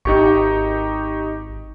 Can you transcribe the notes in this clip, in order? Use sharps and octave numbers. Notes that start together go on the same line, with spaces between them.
G#1 D#4 G4 C#6